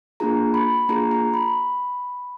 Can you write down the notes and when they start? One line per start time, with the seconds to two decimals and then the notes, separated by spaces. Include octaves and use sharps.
0.20 A#3 D4 F4 G#4 A#5
0.54 B5
0.89 A#3 D4 F4 G#4 A#5
1.11 A#5
1.34 B5